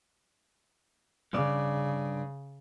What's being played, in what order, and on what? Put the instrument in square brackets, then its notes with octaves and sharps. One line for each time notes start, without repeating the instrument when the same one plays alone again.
[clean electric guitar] G2 D5 [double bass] C#3